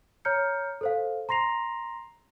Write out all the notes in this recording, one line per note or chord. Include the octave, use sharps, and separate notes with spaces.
C#5 A#5 F6 G6 C#7
A4 C5 F5
A#5 C6 A#6 C7 F7